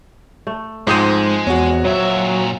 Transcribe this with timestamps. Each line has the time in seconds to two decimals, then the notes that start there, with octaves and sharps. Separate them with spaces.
0.47 A3
0.87 G#2 F3 G#3 C4 C5 D#6 D#7
1.47 E2 F#4 C#5
1.85 A#2 F#3 E5